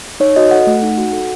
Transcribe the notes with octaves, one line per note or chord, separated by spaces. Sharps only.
D#4 C#5
F#4 D#5
A4 F#5
A3
D#4
F#4
A4